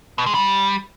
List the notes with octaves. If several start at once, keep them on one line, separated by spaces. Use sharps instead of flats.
B2
G#3
G3